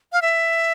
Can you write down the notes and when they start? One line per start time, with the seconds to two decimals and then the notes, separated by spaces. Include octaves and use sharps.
0.13 F5
0.22 E5